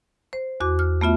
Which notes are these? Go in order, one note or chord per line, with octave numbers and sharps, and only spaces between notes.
C5
E2 F#4 D6
F6
A3 B3 F4 E5